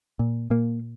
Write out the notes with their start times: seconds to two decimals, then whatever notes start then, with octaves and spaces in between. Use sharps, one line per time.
0.19 A#2
0.50 A#2 A#3